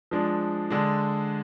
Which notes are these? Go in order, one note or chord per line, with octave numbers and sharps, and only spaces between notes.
F3 G#3 D4
D3 G#3 D4